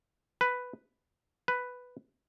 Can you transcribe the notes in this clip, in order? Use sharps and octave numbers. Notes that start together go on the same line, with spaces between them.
B4
B4